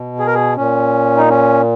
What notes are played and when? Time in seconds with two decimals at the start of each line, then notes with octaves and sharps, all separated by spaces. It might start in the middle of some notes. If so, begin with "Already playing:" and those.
Already playing: B2
0.19 G#4
0.27 A#4
0.35 G#4
0.56 A#2 C#4
1.17 D#4
1.29 C#4